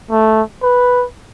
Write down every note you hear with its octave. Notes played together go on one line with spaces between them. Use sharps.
A3
B4